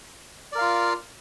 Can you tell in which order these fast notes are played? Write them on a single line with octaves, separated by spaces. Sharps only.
D5 A#4 F5 F4